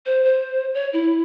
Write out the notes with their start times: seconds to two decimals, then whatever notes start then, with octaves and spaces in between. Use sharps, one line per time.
0.06 C5
0.24 C5
0.74 C#5
0.93 E4